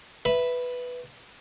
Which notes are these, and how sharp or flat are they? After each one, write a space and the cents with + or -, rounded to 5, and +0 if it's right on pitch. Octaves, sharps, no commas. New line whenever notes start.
B4 +0 E5 +0 B5 +0